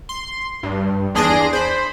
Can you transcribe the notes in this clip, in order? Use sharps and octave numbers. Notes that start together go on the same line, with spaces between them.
C6
G2
E2 D4 G#4 C6 A#6 D7
C5 B5